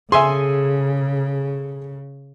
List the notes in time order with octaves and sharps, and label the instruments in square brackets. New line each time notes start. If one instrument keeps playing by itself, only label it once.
[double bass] C#3 [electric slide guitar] G#4 A4 [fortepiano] E5 G#5 C6